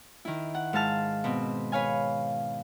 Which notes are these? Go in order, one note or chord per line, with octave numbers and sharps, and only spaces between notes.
D#3 E4
F#5
G#2 F5 A5 F6
B2 C4
B4 C#5 F5 G#5